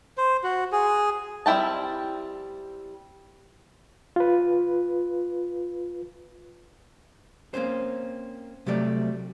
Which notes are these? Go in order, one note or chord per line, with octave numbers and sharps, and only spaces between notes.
C5
F#4
G#4
G3 C4 E4 G5 A5
F4 B4
A#3 C4 C#4 C5
C3 F#3 G3 A3 D5